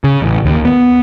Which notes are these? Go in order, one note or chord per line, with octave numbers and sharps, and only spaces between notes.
C#3
A1
D#2
B3